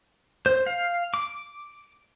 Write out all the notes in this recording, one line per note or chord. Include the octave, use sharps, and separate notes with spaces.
C5
F5
D6